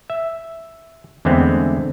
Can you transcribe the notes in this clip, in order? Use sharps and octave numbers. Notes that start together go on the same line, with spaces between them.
E5
E2 D3 G#3 A3 B3 C4